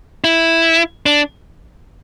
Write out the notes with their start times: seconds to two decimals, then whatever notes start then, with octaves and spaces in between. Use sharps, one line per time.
0.24 E4
1.06 D4